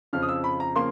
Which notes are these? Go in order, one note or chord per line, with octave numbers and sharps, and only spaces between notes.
F2 C#3 F3 F6
D#6
E6
B5
A#5
C#3 F3 A#3 C6